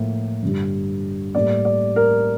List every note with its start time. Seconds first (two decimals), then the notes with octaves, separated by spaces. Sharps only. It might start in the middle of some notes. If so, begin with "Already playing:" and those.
Already playing: A2 F3 A#3
0.42 G2 D3 G3
1.35 A2 G3 A#3 D5
1.65 D5
1.96 A#4